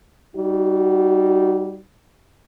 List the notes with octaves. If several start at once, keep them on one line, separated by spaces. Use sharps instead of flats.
G3 D#4 F#4